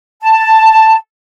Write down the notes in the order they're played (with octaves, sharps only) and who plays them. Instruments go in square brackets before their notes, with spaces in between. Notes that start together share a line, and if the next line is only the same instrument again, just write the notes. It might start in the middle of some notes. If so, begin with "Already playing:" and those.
[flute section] A5